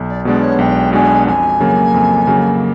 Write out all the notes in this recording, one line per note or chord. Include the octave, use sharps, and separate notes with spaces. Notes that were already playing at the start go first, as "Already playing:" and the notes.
Already playing: B1
D5
B2 G#3 B3 D4 D5
C#5
B1 G5
B2 G#3 B3 D4 G#5
F2 G#5
C#3 F#3 A#3
F2
C#3 F#3 A#3